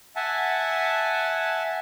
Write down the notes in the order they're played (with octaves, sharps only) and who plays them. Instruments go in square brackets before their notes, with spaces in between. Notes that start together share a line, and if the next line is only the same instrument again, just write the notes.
[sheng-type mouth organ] E5 F#5 G#5 A5